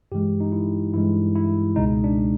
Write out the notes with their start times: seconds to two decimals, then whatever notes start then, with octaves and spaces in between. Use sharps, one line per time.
0.12 G2 E3 G#3 G4
0.40 D#4
0.52 E4
0.94 G2 E3 G#3 E4
1.35 E4
1.76 C#2 B2 G#3 D#4
2.04 D4